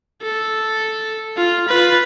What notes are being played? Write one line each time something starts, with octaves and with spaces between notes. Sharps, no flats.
A4
F4
F4 B4